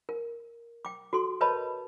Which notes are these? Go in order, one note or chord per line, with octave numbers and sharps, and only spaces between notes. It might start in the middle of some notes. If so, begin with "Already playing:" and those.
A#4
G5 D6
F#4 A4 C6
A#4 B4 C#5 D#5 A5 B5